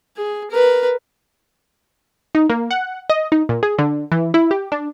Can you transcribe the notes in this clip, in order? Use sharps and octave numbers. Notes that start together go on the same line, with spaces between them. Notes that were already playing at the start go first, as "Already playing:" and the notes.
G#4
A#4 B4
D#4
A#3
F#5
D#5
D#4
A#2
G#4
D3
E3
E4
G4
D4